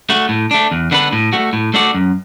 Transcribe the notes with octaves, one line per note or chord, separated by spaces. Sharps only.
A3 F#4
A2
A3 D4
E2
D3 B3 D4 B4
A2
A3 F#4
A2
A3 D4 F#4 D5
F#2